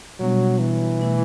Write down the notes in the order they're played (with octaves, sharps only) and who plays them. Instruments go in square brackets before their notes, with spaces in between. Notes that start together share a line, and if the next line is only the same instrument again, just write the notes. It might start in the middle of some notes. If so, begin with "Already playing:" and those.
[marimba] B2 G3 B3 D4 [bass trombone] F#3
[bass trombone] E3
[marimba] B2 A3 E4